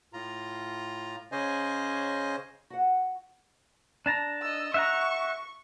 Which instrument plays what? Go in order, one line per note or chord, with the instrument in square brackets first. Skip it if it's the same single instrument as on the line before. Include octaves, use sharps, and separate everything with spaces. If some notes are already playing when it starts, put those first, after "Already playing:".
[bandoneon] A2 F4 A#5
C#3 C#4 C5 D#5 G#5
[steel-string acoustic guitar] F#4 F#5
[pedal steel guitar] D4 A5 A#5
[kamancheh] D#5 E6
[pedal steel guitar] E5 F#5 A#5 [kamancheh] C#6